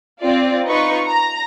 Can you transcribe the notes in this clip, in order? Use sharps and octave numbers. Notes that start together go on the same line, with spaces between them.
C4 F4 D5
D#4 F4 B4 D#5 C#6
A#5